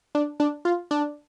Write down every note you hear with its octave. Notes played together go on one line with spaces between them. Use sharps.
D4
D4
F4
D4